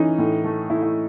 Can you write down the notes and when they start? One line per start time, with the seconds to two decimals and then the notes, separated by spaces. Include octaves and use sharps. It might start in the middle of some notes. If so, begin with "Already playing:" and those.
Already playing: E3 C#4 D#4
0.18 A2
0.44 A3
0.70 A2 E4
0.83 E4